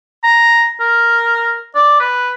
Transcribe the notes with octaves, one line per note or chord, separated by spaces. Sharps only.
A#5
A#4
D5
B4